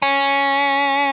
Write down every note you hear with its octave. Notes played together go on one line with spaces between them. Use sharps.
C#4